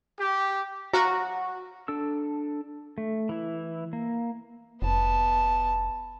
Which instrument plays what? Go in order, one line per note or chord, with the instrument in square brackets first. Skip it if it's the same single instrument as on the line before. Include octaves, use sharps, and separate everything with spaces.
[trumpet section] G4
[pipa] F#3 F5 A#5 [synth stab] F#4
[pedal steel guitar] D4 A4 E6
A3
E3 E4
A#3
[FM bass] F1 [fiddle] B3 A5